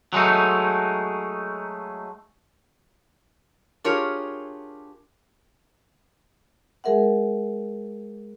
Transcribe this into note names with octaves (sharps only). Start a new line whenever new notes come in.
F#3 G#3 A3 D#4
D4 F4 G4 G#4 A#4 C#5
G#3 G#4 A#4 E5 F#5